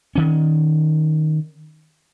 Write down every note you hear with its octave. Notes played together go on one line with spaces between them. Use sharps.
D#3 C#4